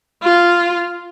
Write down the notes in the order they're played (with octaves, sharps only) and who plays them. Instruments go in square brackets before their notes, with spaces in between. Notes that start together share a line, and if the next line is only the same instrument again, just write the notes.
[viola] F4